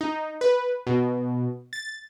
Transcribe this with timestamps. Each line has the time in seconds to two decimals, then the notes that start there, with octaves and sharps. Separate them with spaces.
0.01 D#4
0.41 B4
0.87 B2
1.73 A6